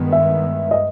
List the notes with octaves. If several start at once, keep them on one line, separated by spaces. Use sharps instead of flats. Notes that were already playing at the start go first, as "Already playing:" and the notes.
Already playing: G2 D#3 G#3 B3
E5
D#5